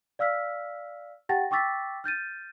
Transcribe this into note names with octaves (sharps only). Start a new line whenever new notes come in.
D5 F5 E6 F6 B6
G4 F#5 G5 A5 A6 A#6
G5 C#6 D6 E6 A6 B6
F6 G6 A6 D#7